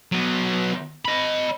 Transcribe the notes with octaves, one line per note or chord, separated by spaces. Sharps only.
F#3 B3
D#5 B5